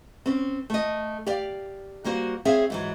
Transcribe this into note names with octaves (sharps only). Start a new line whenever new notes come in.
C4 C#4
A3 D#5
G4 D5 F5
G3 A#3 F#4 C5
C4 G#4 C#5 E5 F5
G#2 E3 F#3